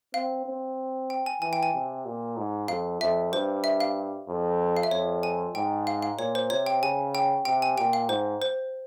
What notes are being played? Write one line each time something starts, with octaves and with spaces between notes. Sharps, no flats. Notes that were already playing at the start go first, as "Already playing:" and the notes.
C4 F5
C4
G5
G#5
E3 G#5
G5
G#5
C3
A#2
G#2
F2 F5
F2 E5
G2 C5
E5
F5
F2
F5
E5
F2 C#5
G#5
G#2 G5
F5
F5
A#2 C#5
C5
C3 C#5
G5
C#3 G#5
G5
C3 G5
G#5
A#2 G5
F5
G#2 C5
C5